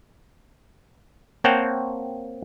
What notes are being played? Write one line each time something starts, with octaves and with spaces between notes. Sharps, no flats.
A#3 C4 C#5 F#5 G5 A5